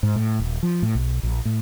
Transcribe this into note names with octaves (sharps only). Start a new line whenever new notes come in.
G#2
A2
D#1
F3
A2
B1
A#1
A2